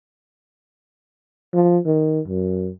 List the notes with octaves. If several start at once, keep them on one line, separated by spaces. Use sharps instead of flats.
F3
D#3
F#2